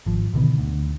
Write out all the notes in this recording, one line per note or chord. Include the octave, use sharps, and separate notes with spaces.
G#1 F3
B2 D3 D#3 B3
D2